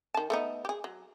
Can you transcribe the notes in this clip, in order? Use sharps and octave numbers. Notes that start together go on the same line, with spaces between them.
D#3 A5
A3 B3 D#4
G4 G#4
F#3